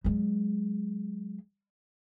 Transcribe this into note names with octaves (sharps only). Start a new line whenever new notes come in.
F#3 G#3